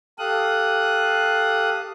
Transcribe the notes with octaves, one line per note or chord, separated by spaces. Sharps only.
G4 A4 F5 D#6 F#6